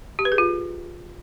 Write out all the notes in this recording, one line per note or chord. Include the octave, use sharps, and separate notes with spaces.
G4
B4
G#4
F4